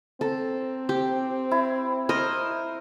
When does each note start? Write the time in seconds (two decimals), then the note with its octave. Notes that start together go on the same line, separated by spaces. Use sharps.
0.21 C4 A4 A#5
0.89 G4
1.51 E4
2.09 A#4 C5 D#5